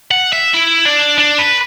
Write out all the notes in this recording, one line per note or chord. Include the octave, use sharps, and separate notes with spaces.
F#5
E5
E4
D4
D4
B4